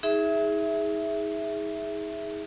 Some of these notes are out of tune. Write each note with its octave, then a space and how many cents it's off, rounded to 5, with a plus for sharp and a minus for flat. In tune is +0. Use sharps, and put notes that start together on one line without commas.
D#4 +40 G#4 +0 E5 +0